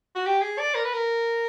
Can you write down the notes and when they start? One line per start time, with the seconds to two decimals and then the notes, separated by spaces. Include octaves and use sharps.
0.16 F#4
0.26 G4
0.42 G#4
0.59 D5
0.75 A#4
0.84 B4
0.93 A#4